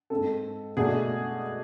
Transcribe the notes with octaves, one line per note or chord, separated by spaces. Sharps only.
G#2 G#3 C4 A4
B2 A3 D4 G#4